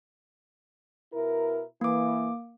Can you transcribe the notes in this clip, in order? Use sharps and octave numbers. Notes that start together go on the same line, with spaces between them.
B2 E4 A#4
E3 A#3 D6